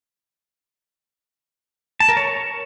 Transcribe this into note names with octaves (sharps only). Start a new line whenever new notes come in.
A5
A#4
C#5